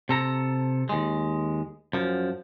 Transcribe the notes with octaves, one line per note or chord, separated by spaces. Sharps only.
C3 A4 A#5
D#2 G#3
F#2 F3